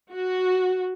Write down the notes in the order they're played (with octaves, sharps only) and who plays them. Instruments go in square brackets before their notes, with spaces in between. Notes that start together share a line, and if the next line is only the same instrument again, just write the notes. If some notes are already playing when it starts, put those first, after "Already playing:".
[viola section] F#4